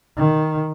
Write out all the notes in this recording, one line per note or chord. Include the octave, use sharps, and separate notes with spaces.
D#3